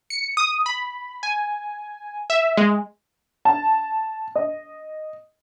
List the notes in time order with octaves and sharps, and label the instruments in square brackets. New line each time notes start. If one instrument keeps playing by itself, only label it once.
[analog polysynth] C#7
D#6
B5
G#5
E5
G#3
[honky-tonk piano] A5
D#5